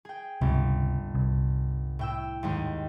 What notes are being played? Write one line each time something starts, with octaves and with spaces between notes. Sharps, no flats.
G#4 G5
G1 C#2 C3
C2
A2 G5 E6
D#2 G#2 G#3